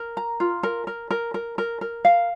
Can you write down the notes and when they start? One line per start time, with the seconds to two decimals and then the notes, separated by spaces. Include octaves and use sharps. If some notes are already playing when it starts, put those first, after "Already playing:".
Already playing: A#4
0.17 A#5
0.40 F4
0.63 A#4
0.87 A#4
1.11 A#4
1.34 A#4
1.58 A#4
1.81 A#4
2.05 F5